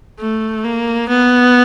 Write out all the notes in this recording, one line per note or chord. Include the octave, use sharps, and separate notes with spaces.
A3
A#3
B3